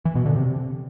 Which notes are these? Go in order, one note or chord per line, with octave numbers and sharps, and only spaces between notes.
E3
B2
D3
C3